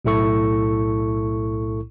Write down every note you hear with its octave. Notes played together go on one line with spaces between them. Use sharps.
B1 A2 E4 A4 C#6